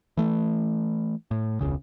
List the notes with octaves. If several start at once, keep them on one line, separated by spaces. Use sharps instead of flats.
E3 A3
A2
E1 C#2 C#3